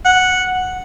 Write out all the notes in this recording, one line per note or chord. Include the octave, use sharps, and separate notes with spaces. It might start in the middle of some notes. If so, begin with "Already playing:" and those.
F#5